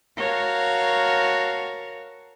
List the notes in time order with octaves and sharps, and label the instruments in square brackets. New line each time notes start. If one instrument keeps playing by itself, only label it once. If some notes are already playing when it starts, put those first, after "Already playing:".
[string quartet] F#4 A#4 C#5 F5 A5